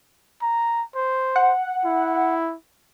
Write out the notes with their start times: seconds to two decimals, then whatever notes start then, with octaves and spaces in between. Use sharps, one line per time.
0.42 A#5
0.96 C5
1.36 F#5
1.85 E4